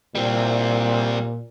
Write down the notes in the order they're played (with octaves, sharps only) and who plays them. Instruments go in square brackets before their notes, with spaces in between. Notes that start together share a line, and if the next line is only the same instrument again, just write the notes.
[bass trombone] A#2 [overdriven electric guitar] G3 C4